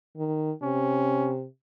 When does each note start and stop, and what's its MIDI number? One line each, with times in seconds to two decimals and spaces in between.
0.17 0.51 51
0.63 1.46 48
0.63 1.34 61